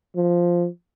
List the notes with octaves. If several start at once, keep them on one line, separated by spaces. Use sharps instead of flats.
F3